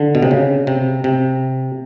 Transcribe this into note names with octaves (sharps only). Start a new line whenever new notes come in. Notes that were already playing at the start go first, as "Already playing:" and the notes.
Already playing: D3
B2
C3
C#3
C3
C3